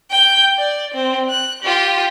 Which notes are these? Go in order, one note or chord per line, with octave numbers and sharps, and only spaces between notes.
G5 G6
D5
C4
F#6
F4 G4